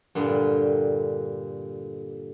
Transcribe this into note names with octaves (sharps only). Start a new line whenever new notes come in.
G2 A#2 D3 G3